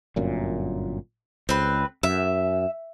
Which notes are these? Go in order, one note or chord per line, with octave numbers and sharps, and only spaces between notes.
G1 F#2 A#2
C#2 C4 B4
F#2 E5